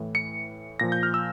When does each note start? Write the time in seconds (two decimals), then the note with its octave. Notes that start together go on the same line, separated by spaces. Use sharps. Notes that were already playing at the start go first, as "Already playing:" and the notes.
Already playing: A2 E3
0.15 C#7
0.80 A#2 F3 A#6
0.92 G6
1.03 F6
1.14 E6